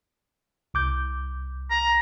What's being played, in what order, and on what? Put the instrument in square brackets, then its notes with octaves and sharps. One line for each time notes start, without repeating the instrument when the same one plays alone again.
[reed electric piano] C2 D6 G6
[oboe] A#5